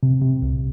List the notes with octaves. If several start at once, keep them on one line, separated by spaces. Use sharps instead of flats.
C3
C3
C2